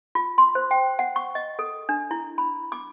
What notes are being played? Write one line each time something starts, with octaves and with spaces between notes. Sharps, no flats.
F4
C6
C5
G5
F#5
C#6
D#5
A4
D4
E4
B5
D6